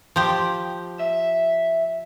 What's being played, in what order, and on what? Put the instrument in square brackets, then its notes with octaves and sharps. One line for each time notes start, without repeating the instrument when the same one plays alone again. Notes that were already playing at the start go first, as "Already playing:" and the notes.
[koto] F3 G4
[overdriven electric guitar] E5